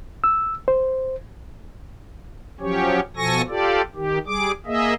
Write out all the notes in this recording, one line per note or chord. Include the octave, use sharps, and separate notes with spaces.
E6
C5
F3 F#3 C#4 G4 C#5
B2 F3 A4 G#5 C#6 A#6
F4 G4 A4 D5
D#3 G4
G3 G#4 D6
A#3 G#4 D#5 E5